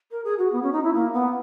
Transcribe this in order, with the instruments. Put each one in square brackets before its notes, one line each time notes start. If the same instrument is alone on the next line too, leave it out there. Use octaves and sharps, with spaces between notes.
[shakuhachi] A#4
G#4
F#4
B3
C#4
D#4
E4
A#3
B3